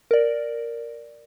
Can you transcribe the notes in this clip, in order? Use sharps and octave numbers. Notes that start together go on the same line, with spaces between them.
A#4 D5